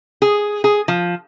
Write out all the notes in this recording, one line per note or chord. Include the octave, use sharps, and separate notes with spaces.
G#4
G#4
F3